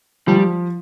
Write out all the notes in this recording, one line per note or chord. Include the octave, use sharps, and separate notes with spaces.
F3 G3